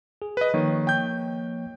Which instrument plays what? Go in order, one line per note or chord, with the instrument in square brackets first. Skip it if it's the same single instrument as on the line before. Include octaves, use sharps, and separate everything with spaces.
[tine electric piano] G#4
[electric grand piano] B4 D#5
[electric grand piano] D#3 [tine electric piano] F3 A#3 C#5
[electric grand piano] G5 G6